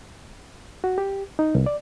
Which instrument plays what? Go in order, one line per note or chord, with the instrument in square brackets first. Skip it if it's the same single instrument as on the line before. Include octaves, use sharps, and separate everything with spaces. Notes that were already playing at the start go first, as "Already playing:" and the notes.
[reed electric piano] F#4
G4
D#4
C2
D5